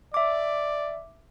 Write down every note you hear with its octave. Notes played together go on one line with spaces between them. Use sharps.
D5 E5 D6